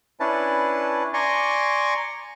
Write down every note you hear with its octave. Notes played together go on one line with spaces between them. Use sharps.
C#4 D4 E4 B4 A5
D5 G#5 A#5 C6 C#6